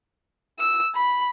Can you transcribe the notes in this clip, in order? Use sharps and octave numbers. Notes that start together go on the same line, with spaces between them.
E6
B5